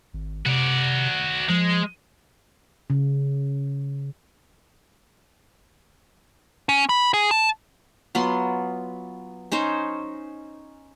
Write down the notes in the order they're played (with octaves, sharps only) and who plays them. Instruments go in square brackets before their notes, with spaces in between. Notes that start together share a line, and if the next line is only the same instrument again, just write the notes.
[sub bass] G#1
[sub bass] C3 [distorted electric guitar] F#4 D5
[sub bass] F3 [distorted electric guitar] G#3
[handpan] C#3
[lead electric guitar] C#4
B5
G#4
A5
[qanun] F#3 B3 F4 C6
C#4 D#4 C5 C#5